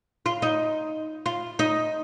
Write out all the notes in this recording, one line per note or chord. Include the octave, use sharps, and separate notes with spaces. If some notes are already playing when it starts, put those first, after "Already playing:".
F4
D#4
F4
D#4